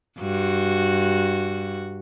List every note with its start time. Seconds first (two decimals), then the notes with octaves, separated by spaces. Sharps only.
0.19 G2 F#4